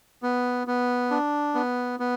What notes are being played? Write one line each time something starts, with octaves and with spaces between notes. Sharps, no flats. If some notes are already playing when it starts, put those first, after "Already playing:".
B3
B3
D4
B3
B3